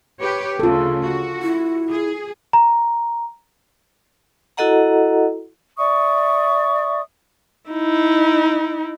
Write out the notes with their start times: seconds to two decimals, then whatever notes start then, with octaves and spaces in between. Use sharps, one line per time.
0.22 G4 B4 C#5
0.60 D2 C#3 F4 A4
1.04 F#4
1.42 E4
1.91 G#4
2.53 A#5
4.57 E4 F#4 A4 D#5 F#5 A#5
5.78 D5 E5 C#6 D#6
7.70 D#4 E4